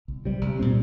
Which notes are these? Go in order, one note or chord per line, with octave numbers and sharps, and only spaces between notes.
C2
C3 G3
C2
A#2 G3 C4